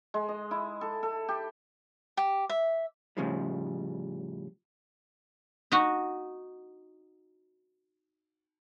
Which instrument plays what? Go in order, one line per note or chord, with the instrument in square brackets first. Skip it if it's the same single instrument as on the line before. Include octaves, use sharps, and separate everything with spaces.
[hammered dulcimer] G#3
D#5
E4
A4
A4
G4
[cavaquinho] G4
E5
[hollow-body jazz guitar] A2 C#3 F3 G3
[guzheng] D#4 F#4